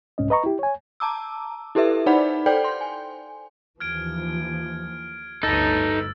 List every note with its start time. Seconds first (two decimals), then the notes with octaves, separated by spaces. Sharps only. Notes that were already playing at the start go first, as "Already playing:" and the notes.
0.18 C2 G#2 C#4 D#5
0.30 B4 D#5 A#5 C#6
0.44 E4 G4
0.59 C#5 G#5
1.00 A5 A#5 D6 E6
1.75 E4 G4 A4 B4 E5
2.06 D#4 C5 D5 F#5 B5
2.46 A4 C5 D5 G5 G6
2.64 C6
2.81 G#5
3.80 D#2 E3 F3 F6 G#6 D7
5.43 G1 D2 D#4 A4 B4 E6 A6